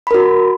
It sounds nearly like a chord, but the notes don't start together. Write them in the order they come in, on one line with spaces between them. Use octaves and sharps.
B5 A#4 F#4